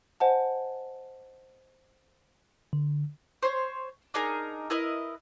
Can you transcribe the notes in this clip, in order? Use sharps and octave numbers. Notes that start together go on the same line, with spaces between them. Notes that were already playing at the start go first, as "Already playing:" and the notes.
C5 D#5 F#5 G#5 A5
D3
C5 C#5
D4 D#4 G#4 A#4
E4 A#4 B4 D#5